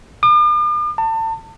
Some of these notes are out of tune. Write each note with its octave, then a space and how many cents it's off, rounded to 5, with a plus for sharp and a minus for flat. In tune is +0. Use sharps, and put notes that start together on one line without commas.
D6 +45
A5 +30